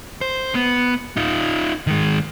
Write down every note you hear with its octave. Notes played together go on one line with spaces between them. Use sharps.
C5
B3
D#4 F4
D#3 G#3